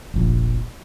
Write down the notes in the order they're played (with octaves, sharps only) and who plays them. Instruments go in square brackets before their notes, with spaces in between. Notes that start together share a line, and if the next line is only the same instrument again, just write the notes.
[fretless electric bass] F1 A#1